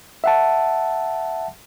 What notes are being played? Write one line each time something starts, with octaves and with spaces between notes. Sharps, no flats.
E5 F#5 A5